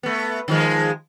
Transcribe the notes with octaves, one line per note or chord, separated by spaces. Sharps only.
A3 B3
D#3 F3 G#3